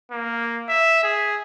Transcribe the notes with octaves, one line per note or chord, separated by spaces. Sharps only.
A#3
E5
G#4